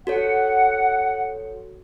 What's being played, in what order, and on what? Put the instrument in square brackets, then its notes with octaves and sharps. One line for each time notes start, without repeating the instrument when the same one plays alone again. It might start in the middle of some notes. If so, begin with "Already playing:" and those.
[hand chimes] F#4 A4 C#5 [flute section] F#5